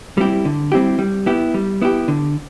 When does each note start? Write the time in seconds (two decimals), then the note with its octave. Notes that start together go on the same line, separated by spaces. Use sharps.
0.18 G3 C4 E4 G4
0.45 D3
0.72 G3 C4 E4 G4
0.99 G3
1.26 B3 E4 G4
1.54 G3
1.82 B3 E4 G4
2.08 D3